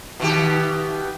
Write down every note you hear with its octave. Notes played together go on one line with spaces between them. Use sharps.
B2 D#3 G4